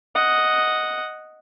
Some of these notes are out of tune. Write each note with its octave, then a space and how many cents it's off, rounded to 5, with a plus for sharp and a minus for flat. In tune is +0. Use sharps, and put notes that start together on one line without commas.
D#5 +0 F#5 +0